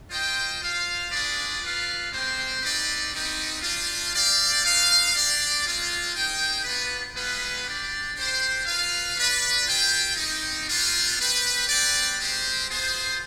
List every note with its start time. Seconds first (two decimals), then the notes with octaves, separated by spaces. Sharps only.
0.09 F4 C5 D#5 G5
0.59 F4 C5 F5
1.10 D4 F4 G#4 B4 D5
1.60 F4 B4 F5
2.10 G#3 C4 G4 C5 G5
2.61 C4 D#4 G4 B4 D5
3.12 G3 C4 D#4 B4
3.61 G3 D4 F4
4.12 C4 G4 D5 F5
4.62 D#4 B4 F5
5.12 D4 G4 D5
5.64 G#3 C4 F4
6.13 D#4 G#4 C5 G5
6.63 B3 D4 F4 B4
7.15 G#3 B3 F4 B4
7.64 D4 G4 D5
8.15 D4 G4 C5
8.65 F4 B4 F5
9.15 D4 F4 B4 D5
9.65 F4 G#4 C5 G5
10.16 G3 C4 D#4
10.67 G3 B3 D4 F4
11.17 C4 G4 B4
11.67 C4 G4 B4 D5
12.17 G#3 C4 G4 C5
12.68 B3 F4 G#4 C5